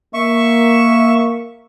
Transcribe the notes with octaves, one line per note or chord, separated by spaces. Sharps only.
A#3 E5 C#6